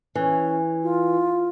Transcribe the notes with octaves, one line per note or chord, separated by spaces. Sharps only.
E3 C#4
F4